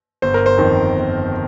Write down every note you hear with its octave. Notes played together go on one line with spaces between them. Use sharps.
G1 C5
A#4
C5
F2 D#3
G1